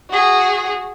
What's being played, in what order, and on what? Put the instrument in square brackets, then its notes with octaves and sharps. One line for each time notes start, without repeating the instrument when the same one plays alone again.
[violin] F#4 G#4